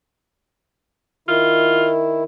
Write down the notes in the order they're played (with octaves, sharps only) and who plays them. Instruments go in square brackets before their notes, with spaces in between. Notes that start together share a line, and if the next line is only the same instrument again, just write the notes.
[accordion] D#3 E4 [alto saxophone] F4